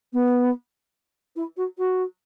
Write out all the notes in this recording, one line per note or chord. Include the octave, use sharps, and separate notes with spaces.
B3
E4
F#4
F#4